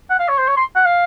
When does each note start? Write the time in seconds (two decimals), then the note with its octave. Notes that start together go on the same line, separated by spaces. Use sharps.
0.10 F#5
0.19 F5
0.28 C#5
0.38 C5
0.48 C#5
0.57 C6
0.75 F#5
0.85 F5